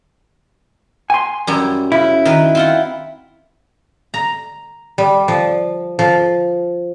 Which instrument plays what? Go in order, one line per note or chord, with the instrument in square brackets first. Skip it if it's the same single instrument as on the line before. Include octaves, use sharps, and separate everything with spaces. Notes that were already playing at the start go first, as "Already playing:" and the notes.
[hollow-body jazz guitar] G#5 C6
[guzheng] F#2 G3 E4
[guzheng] C#3 [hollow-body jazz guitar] E4
[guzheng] D#3 B4
C4 F4 F#5
A#5
G3
F3
F3